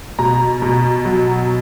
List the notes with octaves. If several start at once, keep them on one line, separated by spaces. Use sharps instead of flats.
B2 A#5
B2
F#3